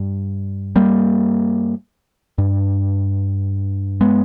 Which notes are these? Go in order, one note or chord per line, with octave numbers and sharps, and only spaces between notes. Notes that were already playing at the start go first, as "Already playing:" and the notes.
Already playing: G2
G3 A#3
G2
G#3 B3